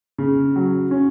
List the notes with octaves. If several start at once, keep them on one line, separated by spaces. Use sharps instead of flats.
C#3
F#3
C#4